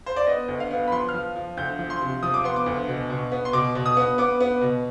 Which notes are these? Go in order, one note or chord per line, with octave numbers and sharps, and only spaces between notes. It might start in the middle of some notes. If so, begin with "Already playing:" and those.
C5
D5
B3 D#5
D2
F5
B3
B5
F3 C6
F6
F3
F3
D2 G6
F3
C6
C3
F3 D#6
D6
B3 C6
D6
D2
B2
B2
B3
C6
B2 D6
B2
D#6
B3
B3 D6
B3
B2